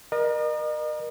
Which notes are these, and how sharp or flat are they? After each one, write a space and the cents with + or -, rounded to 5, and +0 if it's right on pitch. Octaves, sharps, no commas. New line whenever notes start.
A#4 +25 D#5 -40